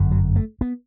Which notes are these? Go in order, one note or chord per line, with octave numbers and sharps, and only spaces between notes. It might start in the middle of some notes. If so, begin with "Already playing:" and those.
Already playing: G1 F#2 D3
F#3
A3
B3